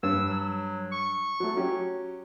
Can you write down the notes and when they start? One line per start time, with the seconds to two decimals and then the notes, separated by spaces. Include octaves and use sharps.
0.03 G2 E6
0.28 F#3
0.92 C#6
1.40 F#3 A3
1.57 F#3 C#4 G4